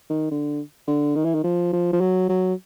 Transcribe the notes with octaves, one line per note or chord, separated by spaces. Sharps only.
D#3
D3
D3
D#3
E3
D#3
F3
F3
F3
F#3
F#3